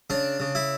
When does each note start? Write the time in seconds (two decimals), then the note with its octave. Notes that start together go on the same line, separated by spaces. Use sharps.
0.10 C#3 D4
0.40 C#3
0.55 E4